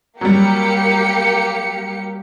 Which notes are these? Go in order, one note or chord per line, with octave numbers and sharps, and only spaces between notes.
F#3 G3 A#3 G4 C#7